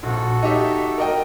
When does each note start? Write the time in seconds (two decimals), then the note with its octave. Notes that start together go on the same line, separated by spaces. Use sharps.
0.03 A#1 F#4 A4
0.43 D#4 G4 E5
0.98 A#4 D#5 G5